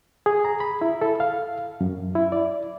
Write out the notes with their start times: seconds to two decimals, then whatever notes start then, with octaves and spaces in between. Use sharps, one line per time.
0.26 G#4
0.45 A#5
0.60 B5
0.81 E4
1.01 A4
1.20 F5
1.81 F#2
2.15 E4
2.32 D5